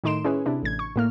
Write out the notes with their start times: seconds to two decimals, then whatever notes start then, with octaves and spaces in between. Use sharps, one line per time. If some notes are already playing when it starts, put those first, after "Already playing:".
0.04 A2 D#3 D#4 C6 D7 E7
0.25 C#4 E4 G#4 B4 C#5
0.46 C3 D4 E4
0.63 A1 G#6
0.79 C#6
0.96 A2 A#3 F6